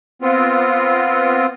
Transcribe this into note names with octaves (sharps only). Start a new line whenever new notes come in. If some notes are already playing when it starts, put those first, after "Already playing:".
B3 C4 F4